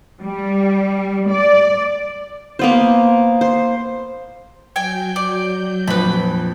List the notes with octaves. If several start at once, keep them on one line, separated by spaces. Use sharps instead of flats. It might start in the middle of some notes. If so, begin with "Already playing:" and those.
G3
D5
A#3 B3 C5
C5
F#3 G5 G#5 G6
D5
A#1 F2 B4 B5